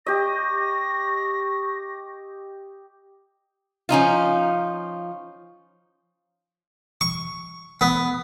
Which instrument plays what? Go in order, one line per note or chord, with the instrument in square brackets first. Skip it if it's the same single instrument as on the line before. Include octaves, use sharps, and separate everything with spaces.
[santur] G4 D#5 [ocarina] C#6 [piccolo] A#6
[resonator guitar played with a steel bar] F3 C#4 D#4 F4
[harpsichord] C#6
B3